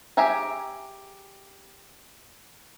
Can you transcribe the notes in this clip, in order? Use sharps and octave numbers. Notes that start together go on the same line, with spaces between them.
G4 G#4 E5 G#5 A#5